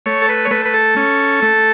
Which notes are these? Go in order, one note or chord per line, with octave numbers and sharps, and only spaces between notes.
A3 C#5
A4
B4
C#5
A3 B4
B4
A4
C#4
A3